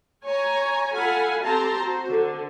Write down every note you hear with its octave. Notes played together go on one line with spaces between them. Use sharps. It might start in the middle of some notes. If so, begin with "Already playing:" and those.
C#5 G#5 A#5
F4 A4 F5 F#5 G#5 B5
C4 G4 A4 A5 A#5 C6
F#4 C5
D3